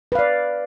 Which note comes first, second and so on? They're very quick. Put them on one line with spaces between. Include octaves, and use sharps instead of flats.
B4 F5 D5